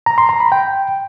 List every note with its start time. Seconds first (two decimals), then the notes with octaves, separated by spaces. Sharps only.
0.06 A#5
0.18 C6
0.29 A#5
0.40 B5
0.52 G5